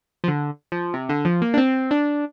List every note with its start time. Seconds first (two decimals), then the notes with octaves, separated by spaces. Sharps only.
0.24 F3
0.28 D3
0.72 F3
0.94 C3
1.09 D3
1.25 F3
1.42 A#3
1.54 D4
1.57 C4
1.91 D4